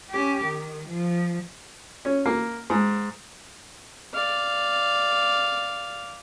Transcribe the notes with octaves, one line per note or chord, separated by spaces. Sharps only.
C#4 G4
D#3
F3
C#4
A#3
G#2
D5 F5